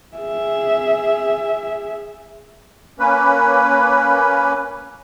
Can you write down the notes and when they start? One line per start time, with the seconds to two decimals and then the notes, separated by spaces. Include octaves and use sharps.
0.16 G#4 E5
2.99 A#3 C#4 B4